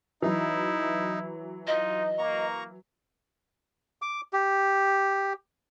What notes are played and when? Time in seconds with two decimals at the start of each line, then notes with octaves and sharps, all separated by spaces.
0.22 E3 F#3 D#4 E4
1.67 D#4 F4 D#5
2.18 A#3 A#5 C#6
4.02 D6
4.33 G4